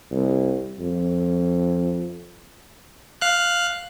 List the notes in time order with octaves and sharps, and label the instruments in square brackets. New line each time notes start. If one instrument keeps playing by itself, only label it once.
[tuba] C2
F2
[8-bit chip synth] F5 F#6